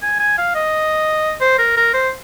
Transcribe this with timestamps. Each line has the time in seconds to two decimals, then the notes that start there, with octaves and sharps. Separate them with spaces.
0.03 G#5
0.19 G#5
0.38 F5
0.55 D#5
1.41 C5
1.59 A#4
1.77 A#4
1.94 C5